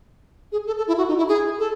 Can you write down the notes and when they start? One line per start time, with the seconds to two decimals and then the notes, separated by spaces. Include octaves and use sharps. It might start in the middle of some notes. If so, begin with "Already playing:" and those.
0.52 G#4
0.67 A4
0.77 A4
0.88 E4
0.98 F#4
1.08 D#4
1.18 E4
1.29 G#4
1.59 A4